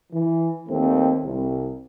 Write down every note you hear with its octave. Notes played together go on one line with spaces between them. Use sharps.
E3
D#2 A3 C4
C2